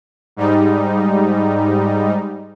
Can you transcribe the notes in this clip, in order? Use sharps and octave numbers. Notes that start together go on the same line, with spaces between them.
G#2 G3 D#4